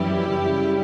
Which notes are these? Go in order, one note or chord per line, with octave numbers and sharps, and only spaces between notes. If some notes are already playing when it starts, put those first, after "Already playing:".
Already playing: F#2 E3 G3 E4 G4
F#2 C#3 G3